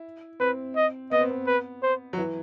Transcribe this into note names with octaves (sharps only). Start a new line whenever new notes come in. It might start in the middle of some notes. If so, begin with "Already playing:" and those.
Already playing: E4
C4 B4
D#5
B3 D#5
C4
B3
B4
C5
F#3
E3